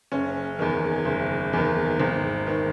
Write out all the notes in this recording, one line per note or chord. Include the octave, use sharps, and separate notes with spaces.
F#1 C#4
E2 D#3
F#1
E2 D#3
G#1
D#3